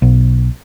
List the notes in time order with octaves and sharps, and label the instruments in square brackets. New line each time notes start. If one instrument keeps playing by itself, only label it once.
[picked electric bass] B1